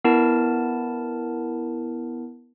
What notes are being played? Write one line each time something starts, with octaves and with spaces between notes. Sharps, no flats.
B3 E4 A#4 A5